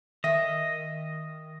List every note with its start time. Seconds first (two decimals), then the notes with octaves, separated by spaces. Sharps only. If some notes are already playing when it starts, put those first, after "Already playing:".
0.24 D#3 D#5 E5